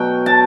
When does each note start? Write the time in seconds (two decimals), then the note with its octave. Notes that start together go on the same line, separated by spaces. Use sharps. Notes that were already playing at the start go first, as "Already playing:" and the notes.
Already playing: B2 F#3 G5
0.26 A5